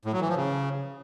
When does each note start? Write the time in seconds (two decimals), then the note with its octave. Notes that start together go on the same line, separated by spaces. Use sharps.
0.05 A2
0.13 F#3
0.21 E3
0.28 F3
0.36 C#3